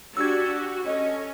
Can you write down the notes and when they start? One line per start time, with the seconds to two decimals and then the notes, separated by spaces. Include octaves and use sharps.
0.17 D4 F#4 G4 E6 G#6
0.86 C#4 A4 D#5